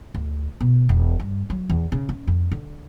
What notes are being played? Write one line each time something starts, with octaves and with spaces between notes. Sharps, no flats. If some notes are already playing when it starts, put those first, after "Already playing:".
D2
B2
E1
G2
F#3
E2
C#3
C#4
F2
D3